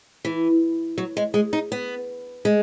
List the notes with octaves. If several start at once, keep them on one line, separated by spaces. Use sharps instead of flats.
E3
F#3
G#3
G#3
D#4
B3
G#3